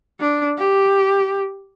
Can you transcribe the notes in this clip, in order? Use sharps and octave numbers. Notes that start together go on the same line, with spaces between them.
D4
G4